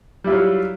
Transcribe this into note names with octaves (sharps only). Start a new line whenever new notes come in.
F#3 G3 E4 F4